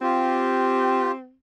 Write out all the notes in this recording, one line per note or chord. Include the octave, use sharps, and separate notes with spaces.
C4 F4 G4